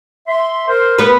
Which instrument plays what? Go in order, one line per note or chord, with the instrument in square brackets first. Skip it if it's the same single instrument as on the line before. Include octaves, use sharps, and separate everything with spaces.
[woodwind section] E5 C6
A#4 C5
[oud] B3 B4